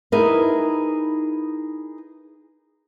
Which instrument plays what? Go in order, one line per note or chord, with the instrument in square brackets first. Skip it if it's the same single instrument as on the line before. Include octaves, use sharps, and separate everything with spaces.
[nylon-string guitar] D#4 E4 G#4 A#4 B4